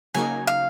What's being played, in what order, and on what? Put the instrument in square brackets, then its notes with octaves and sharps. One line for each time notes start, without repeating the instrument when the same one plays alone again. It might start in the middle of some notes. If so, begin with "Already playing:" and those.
[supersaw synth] C#3 F#3 A#3 D#4 [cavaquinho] G#5
[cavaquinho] F5